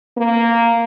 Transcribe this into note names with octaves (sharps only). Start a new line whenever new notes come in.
A#3